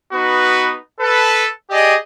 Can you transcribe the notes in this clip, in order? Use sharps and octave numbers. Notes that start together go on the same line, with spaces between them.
B3 D#4 F#4 B4
A4 B4
G4 G#4 D5 D#5